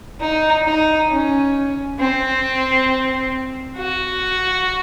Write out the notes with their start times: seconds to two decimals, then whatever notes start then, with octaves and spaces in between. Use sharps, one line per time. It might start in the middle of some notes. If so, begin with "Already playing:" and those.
0.20 D#4
0.65 D#4
1.09 C#4
1.99 C4
3.77 F#4